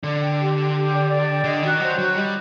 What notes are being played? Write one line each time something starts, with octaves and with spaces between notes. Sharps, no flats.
D3 D5
G5
G4
G5
G4
D5
D5
G5
D3 D#5
D#3 F#4
F#3 C5
F#3 F#4
G3 D#5